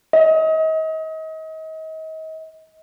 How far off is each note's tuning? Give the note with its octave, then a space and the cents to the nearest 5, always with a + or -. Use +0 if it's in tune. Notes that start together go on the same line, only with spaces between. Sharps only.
D#5 +35